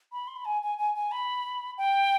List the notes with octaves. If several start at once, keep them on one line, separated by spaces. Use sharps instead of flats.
B5
C6
B5
G#5
G#5
G#5
G#5
B5
G5